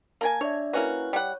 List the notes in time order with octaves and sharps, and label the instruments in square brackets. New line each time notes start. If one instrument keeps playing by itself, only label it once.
[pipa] A#3 A#4 G#5 [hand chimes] A5 G#6
[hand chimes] D4 D5 E5 [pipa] C#5
[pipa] A#3 C#4 F#4 [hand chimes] E4 B4
[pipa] G3 F#5 [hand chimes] C#5